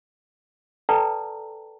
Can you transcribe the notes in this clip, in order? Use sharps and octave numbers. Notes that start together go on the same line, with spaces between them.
A4 B4 D5 G5 A5 A#5